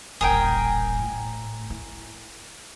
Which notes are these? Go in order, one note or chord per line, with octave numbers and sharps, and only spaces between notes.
D#1 A1 G#4 A#4 G5
A2
E4